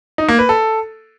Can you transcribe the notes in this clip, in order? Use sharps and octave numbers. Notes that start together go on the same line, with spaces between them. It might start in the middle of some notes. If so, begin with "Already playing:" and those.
D#4
A#3
B4
A4